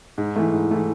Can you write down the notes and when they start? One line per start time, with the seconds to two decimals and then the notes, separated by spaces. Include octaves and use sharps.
0.18 G#2
0.36 E3 A3
0.53 G#2
0.71 E3 A3